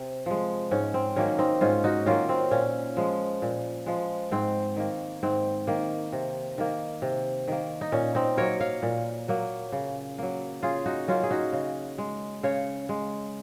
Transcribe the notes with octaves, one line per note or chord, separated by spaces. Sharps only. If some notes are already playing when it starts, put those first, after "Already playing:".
Already playing: C3
F3 G#3
G#2 C#4
C4
D#3 F#3 A#3 C#4
C4 D#4
G#2 C#4 F4
D#4 F#4
D#3 F#3 A#3 C#4 F4
C4
A#2 C#4
F3 G#3
A#2
F3 G#3
G#2 C4
D#3 A#3
G#2 C4
D#3 A#3
C3
D#3 A#3
C3
D#3 A#3
D#4
A#2 C#4
C4 D#4
F#3 A#3 A#4 C#5
C#5 F5
A#2
F#3 A#3
C#3
F#3 A#3
C#3 F4 G#4
D#4 F#4
F#3 A#3 C#4 F4
G#4
D#4 F#4
C#3
G#3
C#3 C#5 F5
G#3